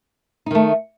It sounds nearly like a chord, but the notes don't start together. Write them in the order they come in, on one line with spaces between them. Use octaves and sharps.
D#4 D#3 A3